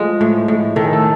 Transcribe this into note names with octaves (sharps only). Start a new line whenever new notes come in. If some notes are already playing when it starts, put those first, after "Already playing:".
Already playing: F3 G#3 A3 A4
A2
A2
D#3 A4
G#4
A3 A4